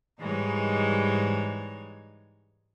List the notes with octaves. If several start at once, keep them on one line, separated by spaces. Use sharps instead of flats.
G#2 E3 G3 G#3 D#4 C#5